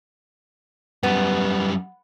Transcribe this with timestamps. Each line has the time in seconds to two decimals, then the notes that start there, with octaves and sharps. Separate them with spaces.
1.03 F#2 G3 B3